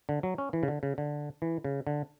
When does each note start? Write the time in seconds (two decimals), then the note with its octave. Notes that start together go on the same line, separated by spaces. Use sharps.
0.09 D3
0.23 F#3
0.38 C#4
0.53 E3
0.63 C#3
0.68 D3
0.83 C#3
0.98 D3
1.42 E3
1.64 C#3
1.87 D3